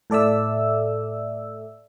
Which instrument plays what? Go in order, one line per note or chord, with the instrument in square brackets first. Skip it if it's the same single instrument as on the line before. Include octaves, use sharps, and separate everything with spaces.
[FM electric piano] A2 A4 D5 E5 E6